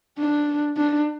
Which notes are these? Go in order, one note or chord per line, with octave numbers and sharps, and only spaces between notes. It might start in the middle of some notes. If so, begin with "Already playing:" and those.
D4
D4